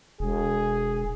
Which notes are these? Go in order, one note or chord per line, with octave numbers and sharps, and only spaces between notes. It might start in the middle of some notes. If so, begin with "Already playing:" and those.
E1 G#4